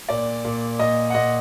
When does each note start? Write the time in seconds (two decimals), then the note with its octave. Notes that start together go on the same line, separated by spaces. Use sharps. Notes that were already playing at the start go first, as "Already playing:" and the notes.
0.09 A#2 D5
0.44 A#2
0.79 A#2 D#5
1.10 F#5
1.14 A#2 D#5